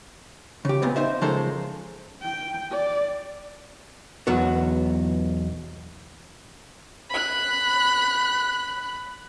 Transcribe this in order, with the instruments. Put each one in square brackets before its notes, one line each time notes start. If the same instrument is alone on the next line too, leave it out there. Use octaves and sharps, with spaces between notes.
[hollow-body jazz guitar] C#3 G4
A#2 B3 C4
D#4 C5 E5
C#3 F3 G#3 A4 A#4 C5
[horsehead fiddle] G5
D5
[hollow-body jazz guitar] B1 E2 F#3 B3 F#4
[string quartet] B5 F#6